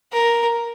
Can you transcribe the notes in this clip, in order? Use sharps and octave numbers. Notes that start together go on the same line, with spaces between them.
A#4